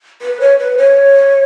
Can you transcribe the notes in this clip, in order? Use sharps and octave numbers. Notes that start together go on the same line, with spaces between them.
B4
C#5
B4
C#5